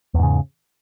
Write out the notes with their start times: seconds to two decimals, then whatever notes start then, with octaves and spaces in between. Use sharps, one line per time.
0.14 E2
0.19 G#2
0.23 C#3